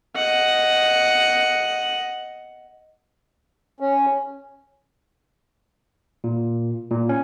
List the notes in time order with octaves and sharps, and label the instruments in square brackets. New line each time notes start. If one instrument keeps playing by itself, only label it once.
[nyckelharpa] D#5 F#5
[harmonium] C#4
[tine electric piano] A#2
A#2
C#4